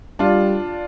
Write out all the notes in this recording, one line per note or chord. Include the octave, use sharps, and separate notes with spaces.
G3 D4 F4